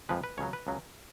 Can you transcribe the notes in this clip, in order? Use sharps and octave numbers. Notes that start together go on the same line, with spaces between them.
F2 F3 G#3 B4
B4
C#2 C#3 F#3 C#5
B4
C#2 C#3 F#3